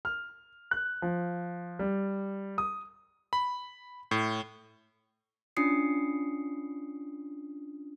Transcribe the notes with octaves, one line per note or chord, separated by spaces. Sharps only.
F6
F#6
F3
G3
D#6
B5
A2
C#4 D4 F4 D#6 C7 C#7